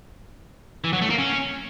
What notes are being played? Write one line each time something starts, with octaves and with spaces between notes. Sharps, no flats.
E3
F#3
A3
A#3
C#4